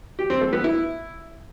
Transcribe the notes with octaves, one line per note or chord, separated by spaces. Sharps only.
G4
C4
A3
B3
E4